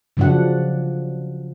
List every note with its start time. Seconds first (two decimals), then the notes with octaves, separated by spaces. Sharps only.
0.17 C#3 F3 F#3 D4 F#5